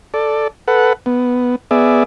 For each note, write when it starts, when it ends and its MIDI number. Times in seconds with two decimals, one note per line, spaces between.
0.14 0.48 69
0.14 0.48 74
0.68 0.93 69
0.68 0.93 71
0.68 0.93 78
1.06 1.56 59
1.71 2.03 59
1.71 2.03 68
1.71 2.03 74
1.71 2.03 76